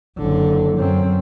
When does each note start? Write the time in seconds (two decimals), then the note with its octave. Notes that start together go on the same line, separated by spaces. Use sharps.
0.17 F#1 D3
0.77 F#2 C4